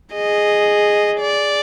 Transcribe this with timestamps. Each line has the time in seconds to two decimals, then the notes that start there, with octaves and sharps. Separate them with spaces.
0.13 G#4 D#5
1.20 D5